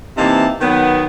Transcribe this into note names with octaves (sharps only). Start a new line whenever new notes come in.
C3 E3 A#3 D#4 A5
D#3 F#3 B3